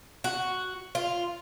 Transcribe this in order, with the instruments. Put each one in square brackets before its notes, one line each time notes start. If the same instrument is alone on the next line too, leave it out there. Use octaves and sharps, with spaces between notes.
[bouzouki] F#4
F4